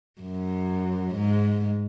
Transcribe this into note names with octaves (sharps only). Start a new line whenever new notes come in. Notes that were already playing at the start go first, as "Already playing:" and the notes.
F#2
G#2